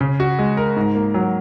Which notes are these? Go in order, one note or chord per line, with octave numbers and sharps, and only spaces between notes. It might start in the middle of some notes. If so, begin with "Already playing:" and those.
C#3
F#4
G#3
A#4
G#2
A#3
F#3